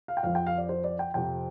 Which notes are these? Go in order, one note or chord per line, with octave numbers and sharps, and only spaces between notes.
F5
G5
F2 F3 F5
G5
F5
D5
C5
D5
G5
F2 C3 F3 G5